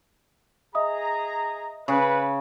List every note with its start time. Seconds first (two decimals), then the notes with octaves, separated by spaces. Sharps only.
0.75 G#4 D#5 E5 A#5 D#6
1.88 C#3 B4